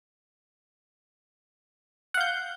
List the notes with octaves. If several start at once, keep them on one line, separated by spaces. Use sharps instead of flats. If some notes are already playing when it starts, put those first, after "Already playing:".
F5 F#5 G6